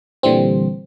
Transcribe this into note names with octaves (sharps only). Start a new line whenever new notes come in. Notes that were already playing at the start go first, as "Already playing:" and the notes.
A#2 D3 E3 G3 C4